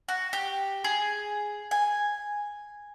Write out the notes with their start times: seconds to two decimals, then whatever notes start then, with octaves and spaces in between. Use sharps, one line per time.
0.08 F#4
0.33 G4
0.84 G#4
1.71 G#5